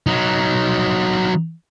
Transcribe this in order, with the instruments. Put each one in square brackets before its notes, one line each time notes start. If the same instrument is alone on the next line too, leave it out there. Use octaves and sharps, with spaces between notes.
[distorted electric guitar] F#3 D#4